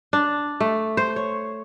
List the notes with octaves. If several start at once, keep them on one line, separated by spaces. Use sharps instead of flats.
D4
A3
C5
C#5